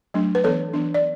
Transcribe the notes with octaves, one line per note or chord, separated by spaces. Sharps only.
F#3 A3 D4
B4
E3 B3 D4 A4 C#5
E3 B3 D4
D5